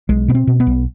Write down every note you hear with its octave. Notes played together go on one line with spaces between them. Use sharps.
B1 G#3
B2 B3
C4
B2
B3
B1